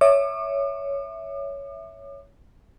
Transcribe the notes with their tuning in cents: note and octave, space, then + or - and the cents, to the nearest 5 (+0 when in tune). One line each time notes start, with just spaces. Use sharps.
C#5 +10 E5 +0 D6 +45